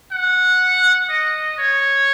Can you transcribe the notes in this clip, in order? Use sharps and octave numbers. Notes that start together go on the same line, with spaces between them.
F#5
D#5
C#5